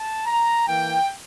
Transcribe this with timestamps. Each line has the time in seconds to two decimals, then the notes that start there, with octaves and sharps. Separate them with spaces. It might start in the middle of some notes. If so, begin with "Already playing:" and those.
Already playing: A5
0.26 A#5
0.68 E3 A#3 G5